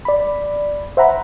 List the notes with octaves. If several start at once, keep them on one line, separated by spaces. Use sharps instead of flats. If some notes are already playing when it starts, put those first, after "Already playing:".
D5 B5
C5 E5 F#5 A#5 B5